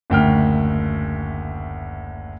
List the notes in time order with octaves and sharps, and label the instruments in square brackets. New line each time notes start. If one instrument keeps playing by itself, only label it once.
[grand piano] F#1 D2 G5 F6